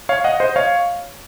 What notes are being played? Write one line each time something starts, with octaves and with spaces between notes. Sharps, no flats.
C#5 F5
D#5 F#5
C5 D#5
C#5 F5